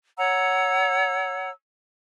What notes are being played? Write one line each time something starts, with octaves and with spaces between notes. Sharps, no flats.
C#5 F#5 A#5 E6